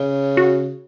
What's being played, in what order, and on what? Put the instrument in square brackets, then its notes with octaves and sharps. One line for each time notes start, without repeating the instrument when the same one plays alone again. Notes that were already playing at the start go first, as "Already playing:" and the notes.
Already playing: [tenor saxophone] C#3
[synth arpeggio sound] F#4